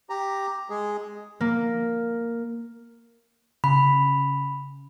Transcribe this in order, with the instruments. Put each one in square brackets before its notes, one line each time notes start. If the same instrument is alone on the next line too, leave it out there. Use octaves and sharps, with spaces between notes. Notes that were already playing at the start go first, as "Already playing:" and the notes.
[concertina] G4 A#5
G#3 G#4
[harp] A#3
[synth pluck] C#3 [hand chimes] B5